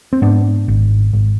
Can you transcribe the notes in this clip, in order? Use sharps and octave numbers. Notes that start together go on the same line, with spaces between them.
C4
G#2 B3 D4
G#1
G#1